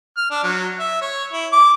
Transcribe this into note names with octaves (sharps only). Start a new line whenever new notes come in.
F6
D4
F#3
E5
C#5
E4
D6